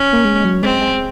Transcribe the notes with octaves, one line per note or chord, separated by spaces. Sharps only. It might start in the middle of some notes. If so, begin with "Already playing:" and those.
Already playing: C#4
A#3
G#3
F#3
G#3 C4
G#3